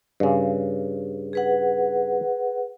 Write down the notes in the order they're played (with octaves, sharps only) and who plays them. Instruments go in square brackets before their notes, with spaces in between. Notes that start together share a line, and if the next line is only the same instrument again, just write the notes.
[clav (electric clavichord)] G2 C#3
[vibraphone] G#4 B4 F#5